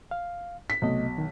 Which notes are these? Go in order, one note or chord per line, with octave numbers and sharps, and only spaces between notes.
F5
B6
B1 C3 A3 D#5
D#3